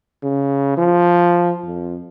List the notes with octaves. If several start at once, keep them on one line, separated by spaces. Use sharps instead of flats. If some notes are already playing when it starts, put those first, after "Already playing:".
C#3
F3
F2